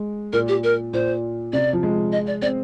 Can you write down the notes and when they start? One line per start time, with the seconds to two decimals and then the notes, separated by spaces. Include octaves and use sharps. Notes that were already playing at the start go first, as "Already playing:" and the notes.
Already playing: G#3
0.33 A#2 A#4
0.48 G4
0.64 A#4
0.93 A#2 C5
1.53 C3 D5
1.73 F3
1.83 G#3
2.12 D#5
2.27 D5
2.42 C4 D5